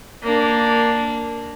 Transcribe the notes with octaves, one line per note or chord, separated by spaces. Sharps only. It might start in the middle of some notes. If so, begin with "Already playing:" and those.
A#3 D4